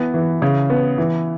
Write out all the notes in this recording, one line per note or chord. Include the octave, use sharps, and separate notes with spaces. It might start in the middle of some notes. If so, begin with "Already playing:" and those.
Already playing: E3 B3
E3
C#3
B3
E3